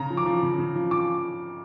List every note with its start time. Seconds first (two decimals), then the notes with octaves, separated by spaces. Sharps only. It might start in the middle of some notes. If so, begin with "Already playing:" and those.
Already playing: C#3 A#5
0.10 F3
0.17 D6
0.26 F3
0.43 C#3
0.58 C#3
0.76 F3
0.91 F3 D6